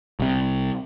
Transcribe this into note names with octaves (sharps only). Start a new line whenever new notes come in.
C2 C3